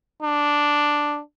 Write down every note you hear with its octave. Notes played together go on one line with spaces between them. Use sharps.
D4